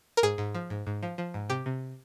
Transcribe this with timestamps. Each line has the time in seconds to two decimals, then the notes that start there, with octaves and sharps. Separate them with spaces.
0.17 A#4
0.23 G#2 G#4
0.38 G#2
0.55 F3
0.70 G#2
0.87 G#2
1.03 F3
1.18 F3
1.34 G#2
1.49 C3 G4
1.66 C3